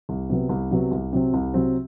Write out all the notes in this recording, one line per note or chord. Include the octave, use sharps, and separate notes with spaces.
C2
C3 F#3 B3
C2
C3 F#3 B3
C2
C3 F#3 C4
C2
C3 F#3 C4